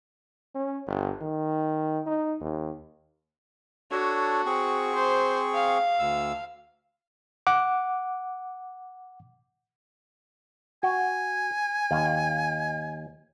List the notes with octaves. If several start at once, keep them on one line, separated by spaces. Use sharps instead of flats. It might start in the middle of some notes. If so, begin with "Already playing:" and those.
C#4
G1
D#3
D#4
D#2
D4 F#4 A4 C#5
C4 G#4 C#6
C5
F5
D2 E6
F#5 D6
F#4 G#5
D#2 F5